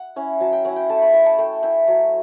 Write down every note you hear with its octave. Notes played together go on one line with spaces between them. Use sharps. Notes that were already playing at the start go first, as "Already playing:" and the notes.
Already playing: F#5
C#4 E4
F#3 A5
G5
C#4 E4 F#5
G5
A3 A5
B5
E4 C#6
A5
A3 G5
E4 G5
F#3